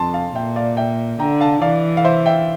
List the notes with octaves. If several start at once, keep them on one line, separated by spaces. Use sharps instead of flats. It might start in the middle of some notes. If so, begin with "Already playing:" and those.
Already playing: F2 A5 C6
F5 A5
A#2 E5 G5
D5 F5
E5 G5
D3 G5 A#5
F5 A5
E3 D5 F5
F5
C5 E5
E5 G5